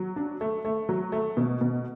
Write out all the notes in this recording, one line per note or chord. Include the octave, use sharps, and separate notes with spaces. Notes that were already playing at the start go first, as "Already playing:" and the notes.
Already playing: F#3
D4
A3
A3
F#3
A3
B2
B2